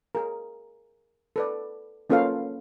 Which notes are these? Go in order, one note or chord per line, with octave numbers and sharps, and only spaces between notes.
G#4 A#4
A4 B4 D5
A#3 C#4 F4 A4 B4 F5